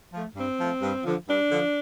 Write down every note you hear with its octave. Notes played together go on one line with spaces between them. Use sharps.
F3 A3
G2 C4
F3 A3
G2
D3 F3
G2 D4
D3 F3